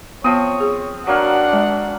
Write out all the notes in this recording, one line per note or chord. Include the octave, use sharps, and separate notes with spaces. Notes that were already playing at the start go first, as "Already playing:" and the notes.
F3 B3 C4 C#5 D#6
G#4
F#3 A#3 D4 F5 F#5
G#3